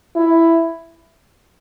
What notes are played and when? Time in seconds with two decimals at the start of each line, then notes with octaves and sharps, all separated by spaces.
0.16 E4